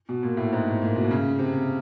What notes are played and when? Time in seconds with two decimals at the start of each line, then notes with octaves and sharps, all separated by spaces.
0.09 B2
0.23 A#2
0.37 A2
0.53 G#2
0.82 A#2
0.96 B2
1.11 C#3
1.39 C3